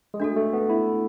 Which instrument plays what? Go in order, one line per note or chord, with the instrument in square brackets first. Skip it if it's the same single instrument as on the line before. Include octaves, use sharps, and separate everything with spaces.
[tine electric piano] G#3
[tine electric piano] A3 [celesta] D4 F#4 A4
[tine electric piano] A3
B3
E4